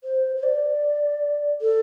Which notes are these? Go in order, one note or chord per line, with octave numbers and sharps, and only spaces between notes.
C5
C5
D5
A4